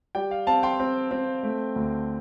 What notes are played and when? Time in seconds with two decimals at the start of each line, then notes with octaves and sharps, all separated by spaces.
0.15 G3 D5 G5
0.31 F5
0.47 C4 F5 A5
0.63 G5 C6
0.80 C4
1.11 C4
1.43 A3
1.76 D2